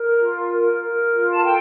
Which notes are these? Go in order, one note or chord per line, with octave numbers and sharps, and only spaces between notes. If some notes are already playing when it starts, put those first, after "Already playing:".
Already playing: A#4
F4
A#4
A#4
F4
A5
A4 G5